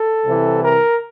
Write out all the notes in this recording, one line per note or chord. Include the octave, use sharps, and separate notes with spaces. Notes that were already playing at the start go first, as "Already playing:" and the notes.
Already playing: A4
C2 C3 E3
A#4